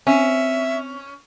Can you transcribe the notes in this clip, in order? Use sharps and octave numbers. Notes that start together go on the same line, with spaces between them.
C4 C#4 E5